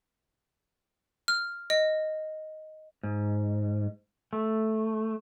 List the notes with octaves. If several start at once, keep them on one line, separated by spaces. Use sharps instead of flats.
F6
D#5
G#2
A3